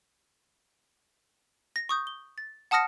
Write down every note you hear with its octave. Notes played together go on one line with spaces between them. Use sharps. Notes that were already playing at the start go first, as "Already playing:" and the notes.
A#6
C#6 D#6 G6
G7
A6
F#5 A5 D#6 F6 A#6 C#7